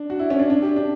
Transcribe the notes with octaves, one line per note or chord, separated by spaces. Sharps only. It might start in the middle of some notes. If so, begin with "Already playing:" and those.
Already playing: D4
F#4
E4
C#4
D4
D4
G4
D4